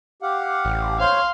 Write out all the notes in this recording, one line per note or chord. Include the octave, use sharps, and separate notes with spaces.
G4 F5 F#5
A1
C5 C#5 F5 C6